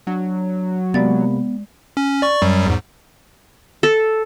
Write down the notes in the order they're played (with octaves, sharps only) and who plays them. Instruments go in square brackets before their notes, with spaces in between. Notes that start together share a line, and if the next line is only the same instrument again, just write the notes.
[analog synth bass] F#3 [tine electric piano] D4
[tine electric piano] C3 A#3 B5 [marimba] G#3 D5 A6 [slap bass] B3
[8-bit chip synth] C#4
D5 C#6
F#2 F#3 G3
E2 G#2
[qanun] A4